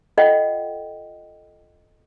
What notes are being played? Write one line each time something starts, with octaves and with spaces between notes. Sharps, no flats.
F4 A4 D#5 F#5 G5